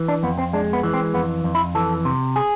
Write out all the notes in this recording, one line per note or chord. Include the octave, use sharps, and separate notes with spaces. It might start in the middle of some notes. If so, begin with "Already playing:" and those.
Already playing: E3
D4
F2 B3
C4
G#3 D4
B3
E3
C4
F2 B3
F2
E4
E3 A4
C3
G#4